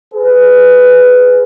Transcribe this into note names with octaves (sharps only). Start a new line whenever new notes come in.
G#4 B4